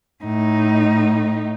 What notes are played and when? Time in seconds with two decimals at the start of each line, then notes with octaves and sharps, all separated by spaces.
0.24 A2 D#4